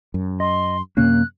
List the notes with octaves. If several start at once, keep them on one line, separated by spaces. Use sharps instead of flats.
F#2
D#5 C6
F#2 C3 A#3 C#4 F#6